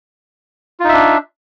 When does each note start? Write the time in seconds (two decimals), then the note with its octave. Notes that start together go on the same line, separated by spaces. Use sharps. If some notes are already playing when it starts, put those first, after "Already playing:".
0.80 F4
0.84 D#4
0.89 E5
0.93 D4